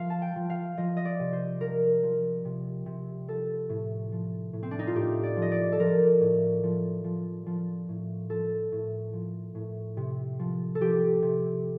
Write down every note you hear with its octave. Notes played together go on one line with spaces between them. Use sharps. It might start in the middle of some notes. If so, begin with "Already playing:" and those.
Already playing: F3 F5
A5
G5
F3
F5
F3 D#5
D#5
D5
C3
C5
F3 A#4
F3
C3
C3
F3 A4
A2
F3
A2
C4
D4
D#4
F4
A2 G4
D5
F3
D#5
D5
A4
F3 A#4
A2
F3
F3
F3
A2
F3 A4
A2
F3
A2
C3
F3
A4
F3 G4
C3